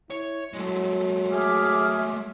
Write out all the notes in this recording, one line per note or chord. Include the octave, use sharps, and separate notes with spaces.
E4 C#5
F#3 G#3 A3
G#4 E5 D6 F6